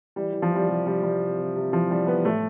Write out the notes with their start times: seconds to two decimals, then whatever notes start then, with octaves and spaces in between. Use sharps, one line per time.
0.16 E3 G3
0.33 E3
0.42 F3
0.51 E3 G3
0.68 C3 G3
0.86 C3 G3
1.03 C3 G3
1.21 C3
1.38 C3
1.55 C3
1.73 E3 F3
1.91 E3 G3
2.07 E3 B3
2.25 A2 A3